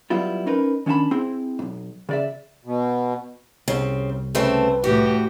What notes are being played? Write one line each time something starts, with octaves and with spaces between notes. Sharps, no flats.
F#3 G3 B3 E4 F4
C#4 D#4 A#4 B4
D#3 C#4 D4 F5 A5 B5
C4 E4 G#4
B1 G#2
C#3 D5 E5
B2
C2 C#3 C4
C#3 A3 C4 B4
A2 E3 F#4 G4